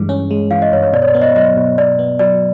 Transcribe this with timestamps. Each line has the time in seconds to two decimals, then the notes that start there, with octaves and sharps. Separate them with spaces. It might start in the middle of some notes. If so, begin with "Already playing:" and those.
Already playing: G2 E3 G#3
0.09 C#4 C#5
0.31 G#3
0.51 E3 F5
0.62 D#5
0.72 G2 C#5
0.83 C#5
0.93 B2 D5
1.02 C#5
1.08 D5
1.14 B3
1.22 D#5
1.36 F#3 D#5
1.57 B2
1.78 B2 D5
1.99 B3
2.19 F#3 D5